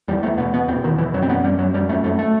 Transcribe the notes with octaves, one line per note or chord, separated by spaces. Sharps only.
E2 G3
E2 A3
B2 B3
B2 B3
E2 C4
E2 D#3
B2 E3
F#2 F#3
C4
F#2 B3
F#2 G3
F#2 F#3
F#2 G3
F#2 A3
F#2 A3
A3